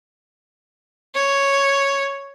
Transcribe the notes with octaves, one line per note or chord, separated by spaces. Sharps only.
C#5